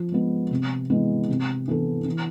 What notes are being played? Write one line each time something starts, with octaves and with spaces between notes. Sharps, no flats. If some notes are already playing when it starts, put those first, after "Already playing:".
Already playing: F3
G#3 B3
C3
E3 G#3 B3
C3
E3 B3 E4 A4
E3